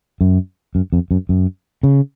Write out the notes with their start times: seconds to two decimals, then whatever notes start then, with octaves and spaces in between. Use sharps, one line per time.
0.21 F#2
0.75 F#2
0.93 F2
1.11 F#2
1.29 F#2
1.83 C#3